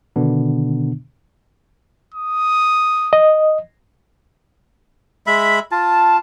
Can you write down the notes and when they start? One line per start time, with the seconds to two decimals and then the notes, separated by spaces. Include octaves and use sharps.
0.16 B2 D3 D#3 B3 D4
2.14 D#6
3.13 D#5
5.27 G#3 E5 B5
5.71 F4 A5